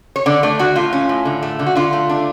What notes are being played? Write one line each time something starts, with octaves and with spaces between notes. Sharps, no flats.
C#5
D3 D5
A3 D5
D3 F#4
A2 F4
C#4
A2
D3
A3
D3
F#4
D3 F4
A3
D4